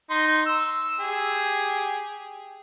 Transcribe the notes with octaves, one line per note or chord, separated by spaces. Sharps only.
D#4 C6
E6
G4 G#4